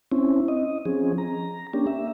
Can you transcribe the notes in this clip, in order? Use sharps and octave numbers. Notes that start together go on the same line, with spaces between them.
C4 C#4 E4
D#5
F3 C4 C#4 G#4
A#5
A#3 C#4 D4 G4
E5